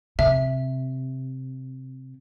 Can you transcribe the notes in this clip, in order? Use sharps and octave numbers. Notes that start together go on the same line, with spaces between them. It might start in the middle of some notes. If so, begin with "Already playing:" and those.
C3 E5